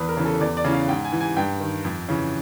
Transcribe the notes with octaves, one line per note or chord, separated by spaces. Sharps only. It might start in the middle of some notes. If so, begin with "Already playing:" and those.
Already playing: E2 B4
A#4
C#3 E3
A4
E2 D5
D5
C#3 E3
F5
G#2 G5
G#5
E3
G#5
G2 G5
D#3
F2
C#3 E3